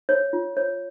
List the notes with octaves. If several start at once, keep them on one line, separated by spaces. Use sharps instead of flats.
C#5
F4
C#5